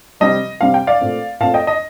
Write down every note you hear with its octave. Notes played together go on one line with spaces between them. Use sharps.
C3 G3 C4 D#5
C3 G3 C4 F5
G5
D5 F5
A#2 A3 C4
A#2 A3 C4 F5 A5
D#5 G5
D#5